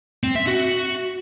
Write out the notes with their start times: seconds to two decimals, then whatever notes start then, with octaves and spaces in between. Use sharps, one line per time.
0.23 C4
0.35 E5
0.47 F#4